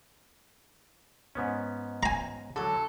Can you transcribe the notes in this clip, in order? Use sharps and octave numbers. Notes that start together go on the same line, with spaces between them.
G#2 B3 C#4
G#5 A#5
D3 F#3 A4